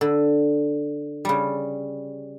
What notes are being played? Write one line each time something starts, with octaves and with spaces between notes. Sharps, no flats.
D3
C#3 G3